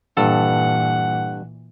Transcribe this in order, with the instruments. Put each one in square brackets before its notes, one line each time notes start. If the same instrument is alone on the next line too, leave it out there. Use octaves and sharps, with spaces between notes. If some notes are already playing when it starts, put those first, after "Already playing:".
[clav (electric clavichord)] G2 A4 [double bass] A#2 E3 [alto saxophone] F#5